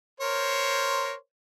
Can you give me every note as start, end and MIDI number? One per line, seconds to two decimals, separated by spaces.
0.20 1.13 70
0.20 1.13 72
0.20 1.13 73